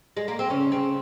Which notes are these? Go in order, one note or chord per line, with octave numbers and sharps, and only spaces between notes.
G#3
A#3
C4
C#3 C#4
C#3 C4